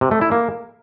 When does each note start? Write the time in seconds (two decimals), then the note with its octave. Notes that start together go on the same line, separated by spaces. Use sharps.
0.01 C3
0.11 A3
0.21 E4
0.32 A#3